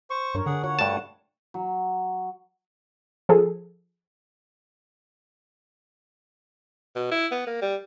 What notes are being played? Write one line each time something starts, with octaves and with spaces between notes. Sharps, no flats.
C5 C#6
G2 D4 A#4 C#5
D3 G#4 F#5
F4 F#4 C#5 F#5
G2 G3 A3 A5
F#3
F3 G#4 A4
B2
E4
B3
A#3
G3